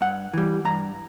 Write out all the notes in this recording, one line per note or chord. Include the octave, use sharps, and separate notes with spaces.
G2 F#5
E3 G3
G2 A#5